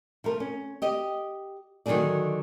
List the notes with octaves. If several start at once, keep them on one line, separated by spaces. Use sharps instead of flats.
F3 A3 A#4
C#4
G4 D#5
D3 D#3 F#3 C4 G#4 D5